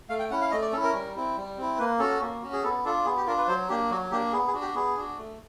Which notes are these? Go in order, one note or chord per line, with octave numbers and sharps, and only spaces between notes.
A3 F5
G5
C#4 E4 F#5
F5
A3 D#5
D5
C#4 E4 A4
A#4
G3
C4 E4
G3
C4 E4
A#3 B4
C#4 F#4 A4
A#3
C#4 F#4
G#4
B3 A4
D4 F4 A4
B3 G#4
G4
D4 F4 A#4
B4
F#3 C5
A#3 D4 G4
F#3 F#4
A#3 D4 G4
B3 G#4
G#4
D4 F#4
G4
B3 G#4
D4 F#4
A3